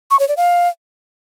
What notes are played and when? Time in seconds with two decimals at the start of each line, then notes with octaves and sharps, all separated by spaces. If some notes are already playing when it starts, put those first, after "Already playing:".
0.11 C#6
0.20 C#5
0.28 D5
0.37 F5